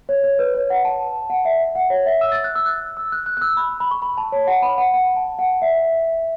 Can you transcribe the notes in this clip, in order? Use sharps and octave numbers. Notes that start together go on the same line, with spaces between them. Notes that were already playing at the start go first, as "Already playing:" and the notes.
C#5
C#5
B4
C#5
F#5
A5
F#5
E5
F#5
C#5
E5
E6
A6
F#6
E6
F#6
E6
F#6
F#6
F#6
E6
B5
B5
C#6
B5
A5
C#5
F#5
B5
F#5
F#5
A5
F#5
E5